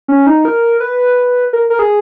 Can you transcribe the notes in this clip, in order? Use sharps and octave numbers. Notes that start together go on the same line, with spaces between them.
C#4
D#4
A#4
B4
A#4
A#4
G#4